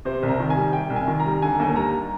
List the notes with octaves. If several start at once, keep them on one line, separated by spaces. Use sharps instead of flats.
C3 C5
C2
A#5
D#3
G#5
G3
C3 G5
C2
G#5
D#3
A#5
G3
D3 G#5
D#2
G3 A#5